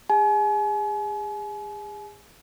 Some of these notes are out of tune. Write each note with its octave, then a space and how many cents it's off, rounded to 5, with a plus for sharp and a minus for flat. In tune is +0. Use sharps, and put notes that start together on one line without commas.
G#4 -35 G#5 +40